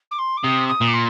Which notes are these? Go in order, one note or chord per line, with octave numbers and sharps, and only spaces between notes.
D6
C6
D6
C3 D#6
D#6
A#2
D6
C6